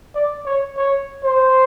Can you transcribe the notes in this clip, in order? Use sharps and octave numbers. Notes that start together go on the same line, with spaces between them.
D5
C#5
C#5
C5